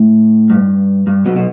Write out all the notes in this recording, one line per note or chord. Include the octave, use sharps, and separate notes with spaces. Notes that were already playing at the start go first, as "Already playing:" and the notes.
Already playing: A2
G2
G2
B1 B2
B2